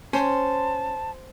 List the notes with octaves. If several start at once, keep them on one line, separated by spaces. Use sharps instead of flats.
C#4 C5 A5